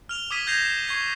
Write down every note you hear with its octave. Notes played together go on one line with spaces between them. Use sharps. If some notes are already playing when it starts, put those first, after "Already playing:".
F6 F7 G7
D6 D#6 F6 G#6 B6 D#7
G6 G#6 A#6 C7 E7 F7
C#6 G#6 C7